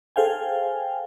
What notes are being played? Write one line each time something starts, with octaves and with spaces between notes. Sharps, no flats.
G#4 A4 C5 F5 G5 G#5